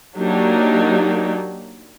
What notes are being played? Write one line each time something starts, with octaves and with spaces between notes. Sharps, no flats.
F#3 A#3 D4 D#4 G4